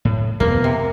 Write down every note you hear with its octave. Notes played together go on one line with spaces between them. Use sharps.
A2
E2 B2 A#3 B3
C3